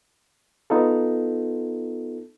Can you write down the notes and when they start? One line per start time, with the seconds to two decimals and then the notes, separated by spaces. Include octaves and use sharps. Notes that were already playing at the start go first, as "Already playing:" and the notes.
0.70 B3 D#4 F4 A4